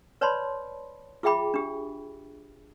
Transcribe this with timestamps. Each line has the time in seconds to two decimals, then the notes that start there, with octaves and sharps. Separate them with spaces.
0.21 B4 C#5 D5 A5 B5 C6
1.23 F4 G#4 E5 G5 B5 D6
1.54 D4 G4